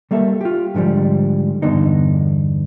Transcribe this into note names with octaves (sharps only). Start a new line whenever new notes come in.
G3 A#3 A4 E5
F4 G4
G#2 D3 F3 G3
E2 G2 D3 B3 D#4